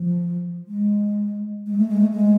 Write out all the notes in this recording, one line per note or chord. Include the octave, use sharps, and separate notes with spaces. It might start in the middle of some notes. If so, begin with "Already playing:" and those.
Already playing: F3
G#3
G#3
A3
G#3
A3
G#3